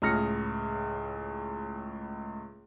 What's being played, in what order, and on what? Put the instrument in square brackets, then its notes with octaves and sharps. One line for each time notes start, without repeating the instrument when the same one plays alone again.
[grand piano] C#2 A2 G#4 F6 A#6 C#7